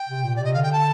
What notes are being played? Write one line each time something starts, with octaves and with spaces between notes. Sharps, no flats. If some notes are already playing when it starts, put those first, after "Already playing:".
Already playing: G5
C3
A#2
D5
C3 D#5
D3 F5
G5
A5